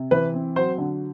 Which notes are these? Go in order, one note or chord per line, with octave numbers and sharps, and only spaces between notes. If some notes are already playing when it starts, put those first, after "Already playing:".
Already playing: C3
E3 B4
C4
F#3 C5
D3